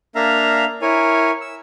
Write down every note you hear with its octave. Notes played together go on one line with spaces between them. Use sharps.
A#3 D4 E5 F5 A#5
E4 A#4 C#5 G#5
E6